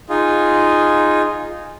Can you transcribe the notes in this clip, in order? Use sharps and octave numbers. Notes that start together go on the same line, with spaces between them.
D#4 F4 G#4